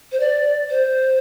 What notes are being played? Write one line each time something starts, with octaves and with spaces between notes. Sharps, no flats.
C5
D5
C5